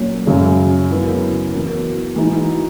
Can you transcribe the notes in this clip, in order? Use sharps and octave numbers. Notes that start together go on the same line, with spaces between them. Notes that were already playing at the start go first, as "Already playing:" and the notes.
Already playing: A#2 F#3 A#3 C#4
F#2 C#3 G#3
C#3 F#3 B3 E4 A#4
E3 B3 F#4 A#4
E3 G#3 D#4 F#4